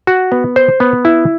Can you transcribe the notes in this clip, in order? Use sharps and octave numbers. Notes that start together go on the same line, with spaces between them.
F#4
B3
C5
B3
E4